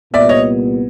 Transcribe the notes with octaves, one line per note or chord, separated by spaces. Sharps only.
C2 A#2 G3 B3 D5 E5
C#5 D#5